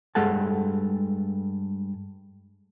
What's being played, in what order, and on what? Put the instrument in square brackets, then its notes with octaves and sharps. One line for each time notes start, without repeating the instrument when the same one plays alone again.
[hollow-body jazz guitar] G2 G#3 A4 F#5 A5